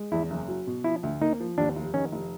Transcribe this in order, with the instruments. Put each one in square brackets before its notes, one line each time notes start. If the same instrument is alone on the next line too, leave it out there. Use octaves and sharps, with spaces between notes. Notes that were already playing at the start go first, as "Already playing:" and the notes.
Already playing: [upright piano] G#3
[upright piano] E2 [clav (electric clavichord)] E4
[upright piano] F#1
F#3
B2
[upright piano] F3 [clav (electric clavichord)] E4
[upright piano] D2
[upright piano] A#3 [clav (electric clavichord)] D#4
[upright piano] F3
[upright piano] D#2 [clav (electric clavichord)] D4
[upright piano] F1
[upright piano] D#3 [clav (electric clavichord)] C#4
[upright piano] F1